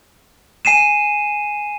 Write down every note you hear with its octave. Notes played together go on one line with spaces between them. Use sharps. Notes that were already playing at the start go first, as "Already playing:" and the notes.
G#5 C7 D#7 E7